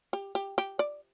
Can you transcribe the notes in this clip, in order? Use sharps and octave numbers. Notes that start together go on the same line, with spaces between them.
G4
G4
G4
D5